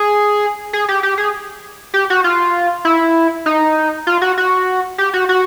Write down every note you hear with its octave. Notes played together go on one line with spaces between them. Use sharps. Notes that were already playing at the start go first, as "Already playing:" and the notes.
Already playing: G#4
G#4
G4
G4
G#4
G4
F#4
F4
E4
D#4
F4
F#4
F#4
G4
F#4
F#4